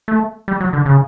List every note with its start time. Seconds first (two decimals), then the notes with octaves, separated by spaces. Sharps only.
0.08 A3
0.48 G3
0.60 F#3
0.73 D3
0.86 C#3